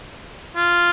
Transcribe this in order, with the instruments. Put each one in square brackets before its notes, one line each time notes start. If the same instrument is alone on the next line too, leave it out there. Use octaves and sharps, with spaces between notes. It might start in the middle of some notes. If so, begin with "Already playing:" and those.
[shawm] F4